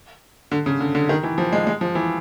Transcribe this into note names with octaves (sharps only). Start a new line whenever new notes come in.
D3
C#3
D3
D3
D#3
E3
F3
G#3
G#3
F3
E3